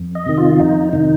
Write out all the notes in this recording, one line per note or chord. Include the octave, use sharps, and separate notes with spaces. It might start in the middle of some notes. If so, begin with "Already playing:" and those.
Already playing: F2
D#5
C3 D#3
F4
F2 D#4
C3 D#3 D#4